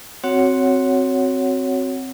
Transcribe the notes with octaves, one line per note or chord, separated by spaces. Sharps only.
C4 F#4 C#5 F#5